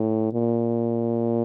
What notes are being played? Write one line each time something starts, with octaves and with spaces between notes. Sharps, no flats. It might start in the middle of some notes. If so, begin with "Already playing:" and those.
Already playing: A2
A#2